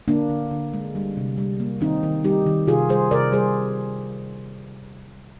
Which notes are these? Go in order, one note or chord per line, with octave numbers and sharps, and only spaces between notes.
D3 A#3 D4
D3
D3
G#3
G3
C3
G3
A#3
D#3 C4 D#4
D#3
G3 D#4 G4
D#3
C3 F4 G#4
G3 G#4 C5
C3 A#4 D5
G3 G#4 C5